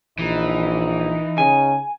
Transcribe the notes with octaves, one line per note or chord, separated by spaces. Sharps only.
A#1 E3 D#4
C#3 G#5